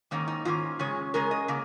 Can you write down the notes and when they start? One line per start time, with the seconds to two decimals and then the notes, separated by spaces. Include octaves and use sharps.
0.11 G#2 D#3 A#3 C#4 D#4
0.28 D#4
0.45 G#2 D#3 A#3 C#4 F4
0.79 C#3 G#3 C#4 C#5
1.14 C#3 G#3 C#4 A#4
1.31 D#5
1.48 C#3 A#3